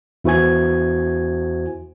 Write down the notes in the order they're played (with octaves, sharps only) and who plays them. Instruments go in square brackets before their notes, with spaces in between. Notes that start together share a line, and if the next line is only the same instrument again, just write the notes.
[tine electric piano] E2 E4 F#4 C5 G#5 G#6